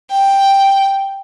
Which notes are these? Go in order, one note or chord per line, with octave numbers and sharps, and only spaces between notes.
G5